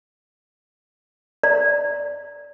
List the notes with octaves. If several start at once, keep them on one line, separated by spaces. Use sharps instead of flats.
D5